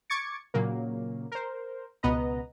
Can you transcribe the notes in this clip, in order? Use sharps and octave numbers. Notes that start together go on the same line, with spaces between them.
C#6 D6 G#6 A6 C#7
A#2 C#3 F#3 A#3
A#4 C5
C#2 B2 B3 B4 D#5 A#5